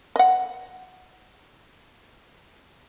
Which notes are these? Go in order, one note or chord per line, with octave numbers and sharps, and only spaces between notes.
D#5 F#5